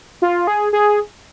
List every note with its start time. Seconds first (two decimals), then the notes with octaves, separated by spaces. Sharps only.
0.22 F4
0.47 G#4
0.73 G#4